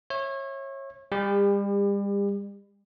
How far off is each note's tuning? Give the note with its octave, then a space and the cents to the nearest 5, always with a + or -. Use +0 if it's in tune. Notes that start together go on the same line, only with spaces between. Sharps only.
C#5 -30 E5 +0
G3 +35 G4 +45